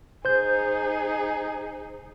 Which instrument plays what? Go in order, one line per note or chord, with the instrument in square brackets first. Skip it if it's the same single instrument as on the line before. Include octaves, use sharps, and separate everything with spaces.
[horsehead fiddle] D#4 G#4 [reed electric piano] C5 G6